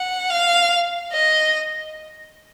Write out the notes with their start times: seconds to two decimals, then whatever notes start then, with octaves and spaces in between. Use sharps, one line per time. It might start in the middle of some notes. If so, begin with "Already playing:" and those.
Already playing: F#5
0.30 F5
1.12 D#5